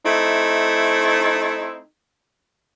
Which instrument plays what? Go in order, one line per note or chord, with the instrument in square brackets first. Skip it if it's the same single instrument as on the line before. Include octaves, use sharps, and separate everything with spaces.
[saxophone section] A3 C4 D#4 E4